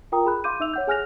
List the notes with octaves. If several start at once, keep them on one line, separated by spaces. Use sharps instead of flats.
F4 A#4 G5 A#5 D#6
G#4 B5 F#6
F5 C6 D6 G6 D#7
D#4 E5 E6 F7
C#5 F#5 G6
G#4 G#5 F6 F#6 A#6 F7